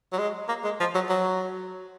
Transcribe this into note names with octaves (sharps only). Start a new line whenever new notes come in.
F#3
G#3
A#3
G#3
F3
F#3
F#3